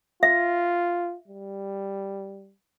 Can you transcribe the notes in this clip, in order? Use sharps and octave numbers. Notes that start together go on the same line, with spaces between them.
F4 E5
G3